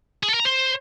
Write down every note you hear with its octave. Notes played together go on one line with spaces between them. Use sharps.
G#4
A4
A#4
A#5
C5